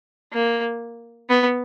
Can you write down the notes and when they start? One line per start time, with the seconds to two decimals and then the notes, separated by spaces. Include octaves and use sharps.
0.33 A#3
1.30 B3